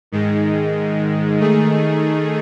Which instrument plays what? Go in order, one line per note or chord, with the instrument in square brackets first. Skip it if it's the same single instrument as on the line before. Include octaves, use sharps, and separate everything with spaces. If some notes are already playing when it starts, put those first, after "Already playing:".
[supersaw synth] G#2 D#3 G#3
D#3 A3 D#4 G#4